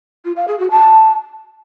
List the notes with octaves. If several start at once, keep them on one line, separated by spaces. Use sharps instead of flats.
F4
F5
G#4
F#4
A5